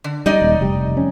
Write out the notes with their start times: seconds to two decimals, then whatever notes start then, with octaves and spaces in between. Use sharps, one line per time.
0.04 D3
0.26 G3 D#4 D5 D#5
0.42 D#1
0.61 F1 G3
0.97 C#4